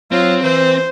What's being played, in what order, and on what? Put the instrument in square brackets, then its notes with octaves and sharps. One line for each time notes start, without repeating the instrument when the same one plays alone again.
[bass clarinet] F#3 [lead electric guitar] C4 [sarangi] F4
[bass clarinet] E3 [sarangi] C5